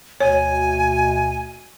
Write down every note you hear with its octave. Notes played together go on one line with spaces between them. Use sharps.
D2 B2 C#5 G#5